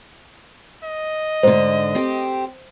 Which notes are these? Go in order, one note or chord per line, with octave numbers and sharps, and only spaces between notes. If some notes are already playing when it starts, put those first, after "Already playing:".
D#5
G#2 D3 C5
C4 G4